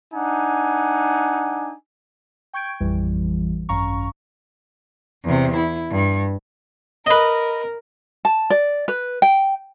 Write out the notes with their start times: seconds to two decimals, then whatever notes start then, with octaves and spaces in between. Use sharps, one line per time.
0.13 D4 D#4 F#5 G#5
2.53 G5 C#6 G6 G#6 D7
2.80 A1 F2 E3 G3
3.69 G#1 F#2 C#4 F5 A#5 C#6
5.25 E2 C3
5.56 E4
5.90 G2
7.06 A#4 B4 D#5
8.25 A5
8.50 D5
8.88 B4
9.22 G5